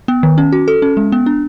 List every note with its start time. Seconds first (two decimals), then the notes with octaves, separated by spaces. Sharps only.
0.08 B3
0.23 D#3
0.38 C#4
0.52 F#4
0.68 A4
0.82 C#4
0.97 G#3
1.12 B3
1.26 D4